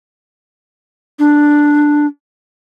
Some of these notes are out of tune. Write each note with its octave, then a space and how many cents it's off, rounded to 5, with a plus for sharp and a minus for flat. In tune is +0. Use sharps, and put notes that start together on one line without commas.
D4 +5